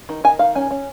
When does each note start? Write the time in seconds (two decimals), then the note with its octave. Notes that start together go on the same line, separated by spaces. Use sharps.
0.09 D#3
0.24 D#3 G#5
0.39 D#3 F5
0.55 C#4 G#5
0.71 C#4